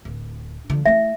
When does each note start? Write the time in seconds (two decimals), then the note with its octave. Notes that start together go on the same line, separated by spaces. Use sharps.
0.05 D1
0.70 D3 F3
0.85 A3 E4 E5